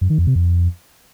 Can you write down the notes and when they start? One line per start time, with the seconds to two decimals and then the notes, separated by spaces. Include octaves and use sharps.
0.01 F#2
0.10 D#3
0.18 F2
0.27 C3
0.36 F2